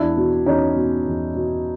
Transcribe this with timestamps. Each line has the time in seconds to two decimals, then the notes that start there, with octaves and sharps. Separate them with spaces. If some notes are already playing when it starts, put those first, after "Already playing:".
Already playing: E2 D4 E4
0.17 B2
0.46 E2 C#4 D#4
0.76 B2
1.06 E2
1.35 B2